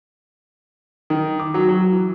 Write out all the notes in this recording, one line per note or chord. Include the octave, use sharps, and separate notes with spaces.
D#3
D6
F#3
F#3
E3